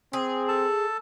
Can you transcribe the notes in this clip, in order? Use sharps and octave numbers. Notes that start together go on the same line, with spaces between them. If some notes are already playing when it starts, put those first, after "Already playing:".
C4 G#4
A4 A5